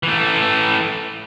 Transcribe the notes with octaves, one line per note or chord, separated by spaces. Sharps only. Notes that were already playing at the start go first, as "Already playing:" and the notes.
E3 A3